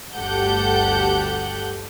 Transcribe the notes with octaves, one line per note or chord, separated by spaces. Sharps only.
G1 D2 G4 A4 F#5 G6